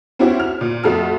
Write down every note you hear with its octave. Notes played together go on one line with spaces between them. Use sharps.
C4 C#4 E4 F#4 G4 C#5
F6
A#2
F2 A3 F#4 A5 F6